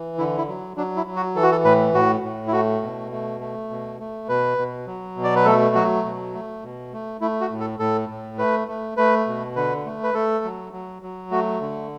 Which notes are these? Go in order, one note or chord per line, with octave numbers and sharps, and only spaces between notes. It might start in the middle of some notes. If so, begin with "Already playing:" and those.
Already playing: E3
D3 E4
E4
F#3
F#3 D4
E4
F#3
F#4
E3 A4
F#4
A4
A2 B4
A2 F#4
A2
E4
A3 F#4
B2
A3
A3
B2
A3
B2 B4
B2
F#3
B2
D5
B4
A3 A4
F#3 F#4
B2
A3
B2
A3
A3 E4
F#4
A2
A4
A2 A4
A2
A3 B4
A3
A3 B4
B2
D3 B4
A3
B4
A3 A4
F#3
F#3
F#3
A3 F#4
D3